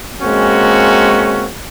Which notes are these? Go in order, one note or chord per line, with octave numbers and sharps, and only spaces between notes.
G#3 A#3 C4 C#4 F#4